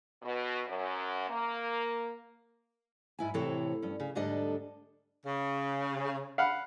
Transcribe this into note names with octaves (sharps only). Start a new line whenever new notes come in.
B2
F#2
A#3
G#2 E4 G#5
A2 C3 E3 C4 A4 C#5
G2 C#4
C#3
D2 G#2 G3 D4 A4 D#5
C#3
F5 F#5 B5